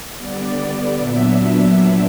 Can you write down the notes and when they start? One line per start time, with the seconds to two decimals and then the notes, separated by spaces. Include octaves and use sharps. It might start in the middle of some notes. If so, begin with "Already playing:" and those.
0.16 D3 G3 B3 D5
0.97 A#2 F#3 B3 D4 E5